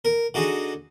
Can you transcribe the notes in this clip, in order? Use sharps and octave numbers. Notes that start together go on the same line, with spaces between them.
A#4
D3 D#4 F#4 G#4